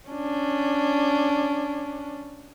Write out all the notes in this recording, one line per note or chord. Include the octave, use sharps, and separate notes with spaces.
C#4 D4